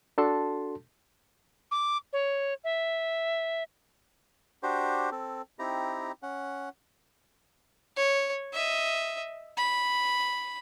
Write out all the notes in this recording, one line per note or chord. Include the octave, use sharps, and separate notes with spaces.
D4 F#4 A4 A5 C6
D6
C#5
E5
D4 F#4 G4 C5
C4 A4
C4 D#4 E4 G4 A#5
C#4 F#5
C#5
D#5 E5
B5